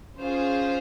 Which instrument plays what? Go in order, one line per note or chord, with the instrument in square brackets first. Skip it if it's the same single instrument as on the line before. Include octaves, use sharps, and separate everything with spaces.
[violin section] C#4 F4 G#4 C5